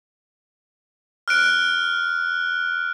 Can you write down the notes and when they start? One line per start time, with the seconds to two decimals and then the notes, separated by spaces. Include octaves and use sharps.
1.28 F6 F#6 D7